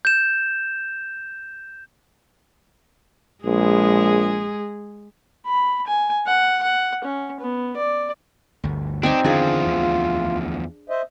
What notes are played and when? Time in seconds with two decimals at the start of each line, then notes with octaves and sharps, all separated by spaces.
0.05 G6 E7
3.45 A#1 G#3 G#4
5.46 B5
5.87 G#5
6.27 F#5
6.63 F#5
7.04 C#4
7.41 B3
7.77 D5
8.63 G1 D2
9.03 C4 D4 D#4 G4 G#5
9.24 E2 D3 D#3 F3 D4 F4 G#4
9.66 D2
10.90 C5 D#5 E5